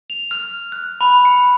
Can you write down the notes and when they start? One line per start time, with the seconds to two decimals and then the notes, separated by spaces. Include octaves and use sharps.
0.10 F7
0.31 F6
0.72 F#6
1.01 B5
1.25 C#7